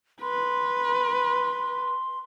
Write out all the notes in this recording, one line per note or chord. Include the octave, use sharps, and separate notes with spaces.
B4 C6